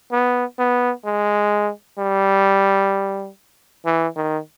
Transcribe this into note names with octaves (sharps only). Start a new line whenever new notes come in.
B3
B3
G#3
G3
E3
D#3